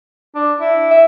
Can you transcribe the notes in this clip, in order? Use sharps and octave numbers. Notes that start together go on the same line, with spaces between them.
D4
E4
E5